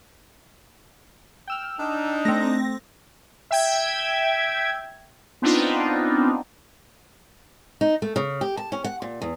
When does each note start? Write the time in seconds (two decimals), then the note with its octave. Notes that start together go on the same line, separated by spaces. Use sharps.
1.48 G5 E6 F6
1.79 D4 D#4
2.25 A3 C4 A#6
3.51 E5 G5 G#6
5.42 B3 C4 D4 D#4 F4
7.81 D#4
8.02 A3
8.16 C#3
8.41 G4
8.57 A5
8.72 C#4
8.84 F#5
9.02 A#2
9.22 E2